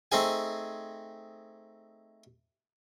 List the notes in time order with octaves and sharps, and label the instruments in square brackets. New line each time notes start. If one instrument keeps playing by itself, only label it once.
[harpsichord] A3 C4 D#4 G#4 G#5